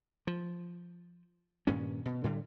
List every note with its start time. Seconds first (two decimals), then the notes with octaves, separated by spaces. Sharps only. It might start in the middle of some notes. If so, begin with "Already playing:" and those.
0.27 F3
1.67 G2 A#2 D#3 C#4
2.06 B2
2.24 A2 D3 G3